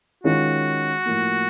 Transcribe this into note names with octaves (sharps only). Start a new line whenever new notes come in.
D#3 G#3 C#4 F4 F#4
A2 F3 A#3